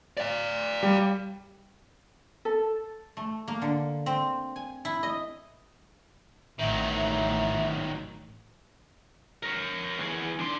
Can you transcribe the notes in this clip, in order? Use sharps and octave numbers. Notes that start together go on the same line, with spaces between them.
D5 F5
G3
A4
A3
A#3
D3
C4
G#5
E4
D#5
A1 D#3 F#3 E5
A#4 C#5
E3 G#4
D4 C6